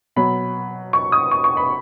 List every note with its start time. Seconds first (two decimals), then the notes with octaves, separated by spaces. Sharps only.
0.16 B2 F#3 B5
0.93 C#6
1.12 D#6
1.31 C#6
1.44 C#6
1.57 B5